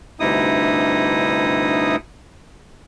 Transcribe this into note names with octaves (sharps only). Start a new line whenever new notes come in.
D2 G2 C3 D#4 E4 D#6